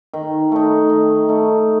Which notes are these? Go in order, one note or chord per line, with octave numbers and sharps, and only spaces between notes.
D#3
A3 D#4
D#3
A3 D#4